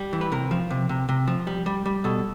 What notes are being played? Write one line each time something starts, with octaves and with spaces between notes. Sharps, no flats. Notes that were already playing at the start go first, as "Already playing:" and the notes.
Already playing: G3
E3
B4
C3 A#4
F3
C3
C3
C3
F3
G3
G3
G3
B2 A4